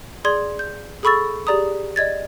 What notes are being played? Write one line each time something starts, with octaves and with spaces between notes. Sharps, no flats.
G#4 D5 C6 G#6
G6
G#4 A4 B5 C#6 E6 A6
G4 G#4 D5 A#5 D#6
D5 D#5 G#6 A6